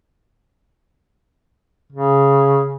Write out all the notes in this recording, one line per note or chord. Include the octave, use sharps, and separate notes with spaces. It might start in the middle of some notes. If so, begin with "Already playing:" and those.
C#3